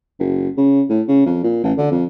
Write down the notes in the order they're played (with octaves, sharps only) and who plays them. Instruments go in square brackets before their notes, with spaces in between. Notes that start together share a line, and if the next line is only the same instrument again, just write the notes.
[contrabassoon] F#1
C#3
A2
C#3
F2
A#2
A1
D3
F2